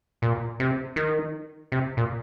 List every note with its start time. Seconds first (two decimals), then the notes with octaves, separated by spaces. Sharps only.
0.22 A#2
0.60 C3
0.96 D#3
1.72 C3
1.97 A#2